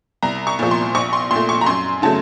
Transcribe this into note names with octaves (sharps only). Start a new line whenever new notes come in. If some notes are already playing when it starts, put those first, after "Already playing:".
C2 A#5
C#6
A#2 F3
C6
A#1 C#6
C6
A#2 A3 C6
C#6
A#5
F#2 C6
C#3 F#3 A3 A5